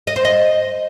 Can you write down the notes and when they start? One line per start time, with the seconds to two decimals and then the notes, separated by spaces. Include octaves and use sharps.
0.07 D#5
0.16 C5
0.25 D#5